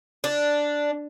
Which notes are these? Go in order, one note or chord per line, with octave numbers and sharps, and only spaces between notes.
D4